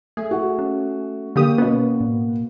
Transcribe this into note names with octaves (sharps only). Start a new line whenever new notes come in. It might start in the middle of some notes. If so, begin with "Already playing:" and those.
A3 G#4
F#4
C#4
D3 A#3 G4 D#6
B2 B3 C#4
A2